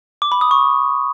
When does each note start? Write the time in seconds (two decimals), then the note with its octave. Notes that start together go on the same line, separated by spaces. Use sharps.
0.22 D6
0.32 B5
0.41 D#6
0.51 C#6